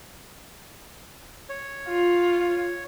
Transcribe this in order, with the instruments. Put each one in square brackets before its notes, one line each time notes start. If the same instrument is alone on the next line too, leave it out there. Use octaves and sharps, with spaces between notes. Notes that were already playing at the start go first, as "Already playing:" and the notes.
[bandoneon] C#5
[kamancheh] F4